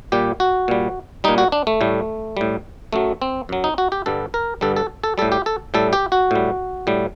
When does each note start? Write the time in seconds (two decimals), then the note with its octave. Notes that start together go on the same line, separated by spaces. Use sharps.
0.12 A#2 G3 G4
0.40 F#4
0.68 A#2 G3
1.24 A#2 G3 D#4
1.38 F#4
1.52 D4
1.67 A3
1.81 A2 G3
2.37 A2 G3
2.93 F#2 F#3 A3
3.22 C4
3.49 F#2 F#3
3.64 D#4
3.78 F#4
3.92 G4
4.06 G2 D3 G3 A4
4.34 A#4
4.61 G2 D3 G3 A4
4.76 A4
5.04 A4
5.18 A2 G3 A4
5.32 G4
5.46 A4
5.74 A2 G3 A4
5.93 G4
6.12 F#4
6.31 A2 G3
6.87 A2 G3